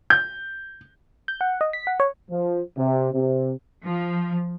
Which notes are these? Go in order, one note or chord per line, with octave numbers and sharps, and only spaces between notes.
G6
G6
F#5
D#5
B6
F#5
C#5
F3
C3
C3
F3